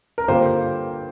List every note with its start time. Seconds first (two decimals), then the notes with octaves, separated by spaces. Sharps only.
0.18 A#4
0.28 G2 D3 A#3 F4 G4 C5